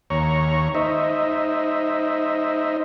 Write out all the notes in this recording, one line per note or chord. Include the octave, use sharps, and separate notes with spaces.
D#2 C#5 A#5 C#6
D#4 C5 D#5 E5